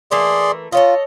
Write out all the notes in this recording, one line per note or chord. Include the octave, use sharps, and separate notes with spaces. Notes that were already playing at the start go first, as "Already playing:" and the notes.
E3 A3 A#3 G#4 D5 C6
F4 A4 C#5 D#5